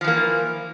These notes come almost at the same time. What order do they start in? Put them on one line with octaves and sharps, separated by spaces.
F3 E3 A#3